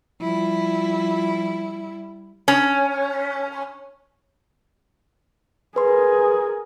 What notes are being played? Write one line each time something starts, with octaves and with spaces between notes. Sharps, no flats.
F3 G3 E4
C#4
G#4 A#4 B4 C6